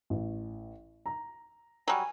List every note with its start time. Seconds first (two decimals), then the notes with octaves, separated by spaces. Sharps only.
0.10 A1
1.06 A#5
1.88 F#3 G3 G#5